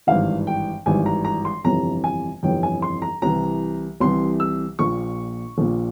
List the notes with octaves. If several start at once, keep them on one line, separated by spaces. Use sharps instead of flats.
G#1 G2 E3 F5
G5
G#1 G2 E3 G#5
A#5
A#5
C6
G1 F2 C3 E3 A#5
G#5
G1 F2 C3 E3 G5
G#5
C6
A#5
C2 C3 E3 A#5
C2 C3 E3 C6
E6
A#1 A#2 C#6
A#1 A#2